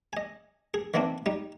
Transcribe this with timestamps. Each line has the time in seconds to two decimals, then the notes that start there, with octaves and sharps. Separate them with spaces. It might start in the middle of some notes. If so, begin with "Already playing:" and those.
0.13 D#5 G#5
0.74 G#4
0.94 D#3 E3 A#3 C4 D4
1.26 G3 D#4